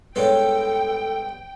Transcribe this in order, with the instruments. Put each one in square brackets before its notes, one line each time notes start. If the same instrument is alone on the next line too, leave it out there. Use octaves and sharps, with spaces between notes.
[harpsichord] G2 G#3 B3 [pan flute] A4 [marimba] B4 C#5 [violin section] G5